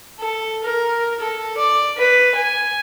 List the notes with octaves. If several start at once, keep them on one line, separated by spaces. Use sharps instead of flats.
A4
A#4
A4
D5
B4
G#5